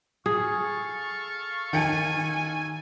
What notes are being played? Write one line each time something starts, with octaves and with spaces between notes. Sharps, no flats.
G#4 A4 F5 C#6
D#3 G#5 A5 C#7